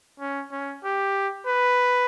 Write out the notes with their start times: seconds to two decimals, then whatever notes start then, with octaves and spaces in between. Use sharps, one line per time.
0.20 C#4
0.52 C#4
0.84 G4
1.47 B4